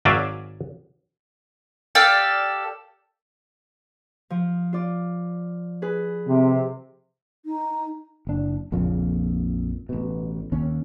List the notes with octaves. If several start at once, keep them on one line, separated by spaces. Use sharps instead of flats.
G#1 F#3 D5 E5 F5 G#5
G4 A4 D5 F5
F3
F4 D5
G#4 B4
C3
D#4
F#1 D4
A#1 F2 A#2 C#3
A1 B2
D#2 C#4